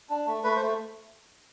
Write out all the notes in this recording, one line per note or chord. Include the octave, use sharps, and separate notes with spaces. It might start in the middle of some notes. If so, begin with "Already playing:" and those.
D4
A3
A3 B4
C5
A3